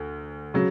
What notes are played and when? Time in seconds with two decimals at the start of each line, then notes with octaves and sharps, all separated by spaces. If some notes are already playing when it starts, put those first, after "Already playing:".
Already playing: D2
0.54 C#3 F#3